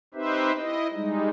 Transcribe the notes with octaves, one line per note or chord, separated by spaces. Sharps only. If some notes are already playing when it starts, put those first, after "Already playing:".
C4 D#4 G4 B4 C5 E5
E4 D#5
G3 G#3 D#4